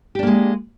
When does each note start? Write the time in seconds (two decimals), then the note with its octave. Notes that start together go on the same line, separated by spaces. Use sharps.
0.15 G4
0.19 D4
0.23 A#3
0.27 G#3